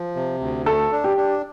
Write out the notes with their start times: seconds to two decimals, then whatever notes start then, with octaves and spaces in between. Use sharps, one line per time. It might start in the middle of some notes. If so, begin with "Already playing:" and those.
Already playing: F3
0.15 C3
0.40 D2
0.66 A3 A4
0.92 D4
1.04 G4
1.17 D4